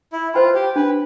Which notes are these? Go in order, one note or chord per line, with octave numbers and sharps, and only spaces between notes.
E4
F4 C5 G5 B5
G4
D4 B4